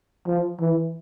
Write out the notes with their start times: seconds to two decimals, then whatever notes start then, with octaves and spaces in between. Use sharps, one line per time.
0.27 F3
0.60 E3